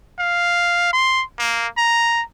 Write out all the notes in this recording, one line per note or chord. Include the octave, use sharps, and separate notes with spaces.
F5
C6
A#3
A#5